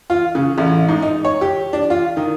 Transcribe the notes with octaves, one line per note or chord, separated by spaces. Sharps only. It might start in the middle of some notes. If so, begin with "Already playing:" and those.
F4
C#3
A1
G#2
D#4
C#5
G4
D4
F4
D#3